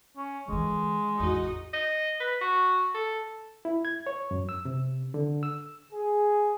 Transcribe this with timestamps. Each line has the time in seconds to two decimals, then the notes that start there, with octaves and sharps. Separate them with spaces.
0.17 C#4
0.48 D3 E3 G#3
1.20 A1 E2 D#4 F#4 D#5
1.74 D#5
2.20 B4
2.41 F#4
2.95 A4
3.65 E4
3.85 G#6
4.07 C#5
4.31 F#2
4.49 E6
4.65 C3
5.14 D3
5.43 E6
5.92 G#4